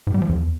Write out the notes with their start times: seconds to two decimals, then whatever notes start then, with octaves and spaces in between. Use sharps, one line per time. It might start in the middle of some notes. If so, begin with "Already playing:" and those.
0.07 G#2
0.14 G3
0.22 F3
0.29 E2